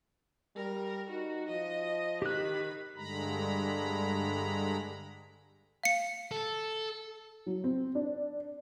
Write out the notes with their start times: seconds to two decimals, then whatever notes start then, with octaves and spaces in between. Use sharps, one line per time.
0.56 G3 A#4
1.09 D#4 F#4
1.48 F3 D#5
2.22 D#3 G4 B5 F#6
2.96 G2 D3 G#3 A#5 B5
5.84 F5 C#7
6.31 A4
7.46 F#3
7.64 C4
7.95 D4